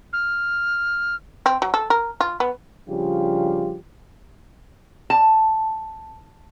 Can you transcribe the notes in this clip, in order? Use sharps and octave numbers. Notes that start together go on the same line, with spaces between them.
F6
C4
F#3
A4
A#4
F4
B3
C#3 F3 G3 D4 F4 G4
A5